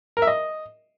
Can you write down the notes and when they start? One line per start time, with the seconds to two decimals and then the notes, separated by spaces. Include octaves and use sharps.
0.17 A#4
0.22 E5
0.27 D#5